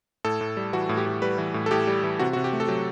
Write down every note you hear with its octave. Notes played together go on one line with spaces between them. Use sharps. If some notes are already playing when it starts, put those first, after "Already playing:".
A2 A4
A2
G3
E3 F#4
A2
G4
A2
G3 B4
E3
A2
A4
A2 G4
G3
E3
C3 F#4
C3 F#4
G4
A3
A4
F#3 G4